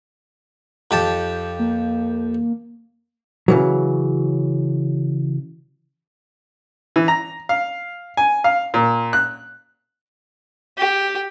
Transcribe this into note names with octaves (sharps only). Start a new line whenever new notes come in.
F2 G4 A5
A#3
C#3 E3 F#3
E3
A#5
F5
G#5
F5
A#2
F#6
G4